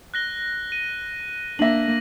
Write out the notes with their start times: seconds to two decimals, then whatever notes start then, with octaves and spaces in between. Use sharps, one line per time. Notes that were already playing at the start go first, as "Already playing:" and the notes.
0.14 F#6 A#6 G7
0.72 D#7
1.59 A#3 D4 E5 A#6 F#7